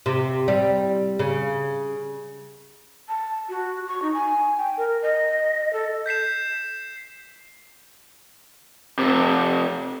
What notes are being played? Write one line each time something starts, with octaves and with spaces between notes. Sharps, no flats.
C3
G3
C#3
A5
F#4
C#6
D#4
G#5
G5
A#4
D#5
A4
G6 B6 C7 E7
F2 C3